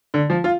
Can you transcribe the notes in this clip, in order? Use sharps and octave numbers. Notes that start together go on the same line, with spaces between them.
D3
F3
F4